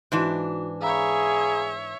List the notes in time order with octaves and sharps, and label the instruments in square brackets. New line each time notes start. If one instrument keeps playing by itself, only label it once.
[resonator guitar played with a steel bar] G#2 E3 D4 [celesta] D#4 F#4
[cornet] G#4 [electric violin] C#5 E5 [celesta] F5 A#5 B5